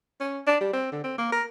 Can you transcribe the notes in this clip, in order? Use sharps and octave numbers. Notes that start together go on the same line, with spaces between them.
C#4
D4
G3
C4
D3
C4
A#3
A#4